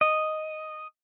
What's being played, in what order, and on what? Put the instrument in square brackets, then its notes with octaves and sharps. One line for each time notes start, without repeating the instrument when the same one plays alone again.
[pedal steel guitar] D#5